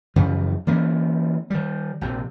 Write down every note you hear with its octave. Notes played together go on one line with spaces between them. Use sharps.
F#2 C#3 E3 F3
E3 A#3 B3 C#4
D#3 G3
A#1 C3